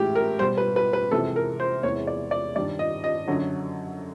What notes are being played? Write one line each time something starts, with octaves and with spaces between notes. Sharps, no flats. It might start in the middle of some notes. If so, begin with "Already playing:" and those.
Already playing: A2 E3 G#3 G4
A#4
B2 G3 C5
B4
B4
B4
F2 C3 E3 G#3 A4
A#4
C5
E2 C3 E3 G#3 C#5
D5
D5
G2 D#3 G3 D5
D#5
D#5
F#2 D3 F#3